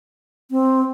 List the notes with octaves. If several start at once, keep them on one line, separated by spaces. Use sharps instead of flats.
C4